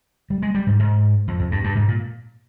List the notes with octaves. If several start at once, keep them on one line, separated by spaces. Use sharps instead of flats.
G3
G#3
G3
G#2
G#2
F2
F2
G2
G2
G#2
A#2